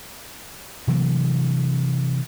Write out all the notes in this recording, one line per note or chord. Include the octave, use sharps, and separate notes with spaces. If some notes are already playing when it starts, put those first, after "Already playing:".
C3 E3 F#3 A#3